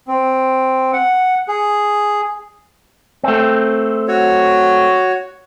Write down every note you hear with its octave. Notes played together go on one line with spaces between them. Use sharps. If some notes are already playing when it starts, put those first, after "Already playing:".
C4
F#5
G#4
A3 C4
F#4 C#5